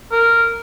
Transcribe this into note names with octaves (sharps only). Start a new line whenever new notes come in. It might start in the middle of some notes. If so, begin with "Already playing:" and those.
A#4